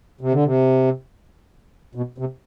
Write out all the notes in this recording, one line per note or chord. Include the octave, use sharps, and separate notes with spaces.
C3
D3
C3
B2
C3